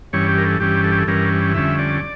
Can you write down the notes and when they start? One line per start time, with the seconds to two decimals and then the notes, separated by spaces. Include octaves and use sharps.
0.13 G2 E3 G3 C#4 C#5
0.29 G4
0.38 A#4
0.45 A4
0.60 G2 E3 G3 C#4 G4
0.84 A4
0.91 G4
0.98 A4
1.07 G2 E3 G3 C#4 A#4
1.55 F2 D3 G3 C#4 E5
1.79 D5